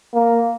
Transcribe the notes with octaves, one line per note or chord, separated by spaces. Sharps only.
A#3